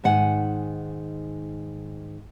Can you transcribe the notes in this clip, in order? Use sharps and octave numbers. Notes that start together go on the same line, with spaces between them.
G#2 D#3 F#5 G#5